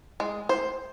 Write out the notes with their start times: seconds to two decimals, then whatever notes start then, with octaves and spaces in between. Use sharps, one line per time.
0.20 G#3
0.49 C5